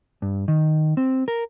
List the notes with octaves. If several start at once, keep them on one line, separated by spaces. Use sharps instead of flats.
G2
D#3
C4
A#4